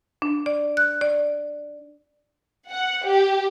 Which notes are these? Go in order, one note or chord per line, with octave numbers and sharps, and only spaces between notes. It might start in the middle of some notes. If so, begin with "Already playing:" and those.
D4
D5
F#6
D5
F#5
G4